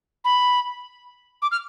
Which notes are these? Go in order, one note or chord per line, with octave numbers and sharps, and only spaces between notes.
B5
D6
F6